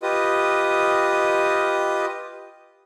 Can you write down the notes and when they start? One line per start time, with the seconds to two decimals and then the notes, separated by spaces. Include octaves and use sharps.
0.02 F4 G4 B4 D#5 D#6